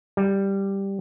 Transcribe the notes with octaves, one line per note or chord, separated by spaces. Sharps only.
G3